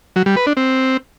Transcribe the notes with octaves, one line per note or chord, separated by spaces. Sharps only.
F#3
G3
B4
D4
C4